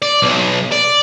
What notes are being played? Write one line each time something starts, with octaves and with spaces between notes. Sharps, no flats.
D5
B1
D5